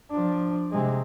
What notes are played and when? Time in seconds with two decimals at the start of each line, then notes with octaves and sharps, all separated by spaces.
0.11 F3 D4
0.72 C3 G#3